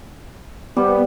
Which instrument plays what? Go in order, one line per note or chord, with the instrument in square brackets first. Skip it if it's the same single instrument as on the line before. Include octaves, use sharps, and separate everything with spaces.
[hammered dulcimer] G3 [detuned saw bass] B3